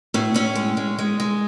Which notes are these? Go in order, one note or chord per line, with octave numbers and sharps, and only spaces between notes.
A2 C#4
A2 C#4
G#3
G#3
G#3
G#3